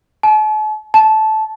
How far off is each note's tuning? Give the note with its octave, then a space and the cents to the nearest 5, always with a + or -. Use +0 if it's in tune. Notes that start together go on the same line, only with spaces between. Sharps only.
A5 -45
A5 -15